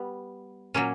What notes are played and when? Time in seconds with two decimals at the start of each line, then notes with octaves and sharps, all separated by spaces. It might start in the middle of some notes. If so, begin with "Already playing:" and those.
Already playing: G3 B3
0.74 A#2 F#3 A#3 C#4